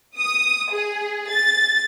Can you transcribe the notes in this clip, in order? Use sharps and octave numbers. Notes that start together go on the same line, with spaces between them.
D#6
G#4
A6